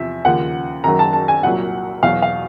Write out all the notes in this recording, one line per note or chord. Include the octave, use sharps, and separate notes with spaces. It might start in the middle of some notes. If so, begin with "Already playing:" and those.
Already playing: E2 C3 F3 E5
D#2 C#3 F3 F#5
F#2 D#3 F#3 A#5
A5
A5
G#5
C2 A#2 F#3 F#5
E2 B2 F#3 F5
F5